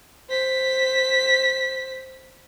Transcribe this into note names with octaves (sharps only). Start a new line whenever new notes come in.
C5 B6